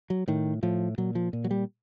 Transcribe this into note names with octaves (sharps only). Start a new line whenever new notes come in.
F#3
A2 D#3
A2 F3
A#2 F#3
F3
A#2
F#3
G3